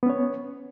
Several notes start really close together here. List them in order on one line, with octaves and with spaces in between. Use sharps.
B3 C#4 C#5